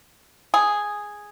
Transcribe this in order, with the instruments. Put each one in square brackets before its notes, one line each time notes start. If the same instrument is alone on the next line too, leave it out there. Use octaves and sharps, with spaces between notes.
[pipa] G#4